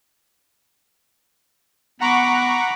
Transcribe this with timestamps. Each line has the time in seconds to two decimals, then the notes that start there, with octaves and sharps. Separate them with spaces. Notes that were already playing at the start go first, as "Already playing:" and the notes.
2.00 B3 F#5 A#5 B5 C#6 D6